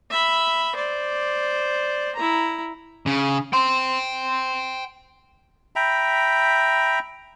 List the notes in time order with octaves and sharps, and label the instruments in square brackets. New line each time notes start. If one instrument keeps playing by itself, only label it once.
[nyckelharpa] E5 B5
C5 D5
E4 A#5
[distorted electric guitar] C#3
G5 C6
[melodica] E5 G5 A#5 B5